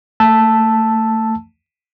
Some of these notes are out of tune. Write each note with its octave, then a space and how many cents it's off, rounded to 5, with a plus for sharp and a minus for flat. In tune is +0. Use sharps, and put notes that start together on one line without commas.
A3 +30 A5 +0 E6 +0